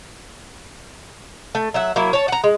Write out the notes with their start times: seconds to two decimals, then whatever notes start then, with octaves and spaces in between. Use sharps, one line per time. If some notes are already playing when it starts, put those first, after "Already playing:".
1.55 A3
1.74 F#3 E5 F#5
1.96 F#3 A#3 E4
2.13 C#5 A5
2.28 F#5 A#5
2.44 G#3